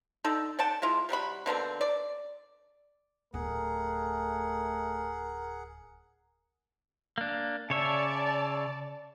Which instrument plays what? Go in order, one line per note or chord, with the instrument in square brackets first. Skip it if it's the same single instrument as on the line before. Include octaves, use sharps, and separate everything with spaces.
[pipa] D3 D#4 A4
D5 F#5 G5 A5
G#3 E4 F4
C3 G3 F#4 B5
B2 D3 A#3 C4
D5
[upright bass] D1 [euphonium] A3 [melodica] G#4 F#5 [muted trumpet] A#4
[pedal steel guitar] A#3 D4
[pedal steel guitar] C#3 C#5 E5 [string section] D5 A5